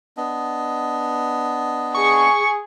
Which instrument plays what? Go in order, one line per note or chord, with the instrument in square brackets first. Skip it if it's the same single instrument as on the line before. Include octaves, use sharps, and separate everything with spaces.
[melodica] B3 D4 D#5
[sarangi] G#4 [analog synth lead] C#6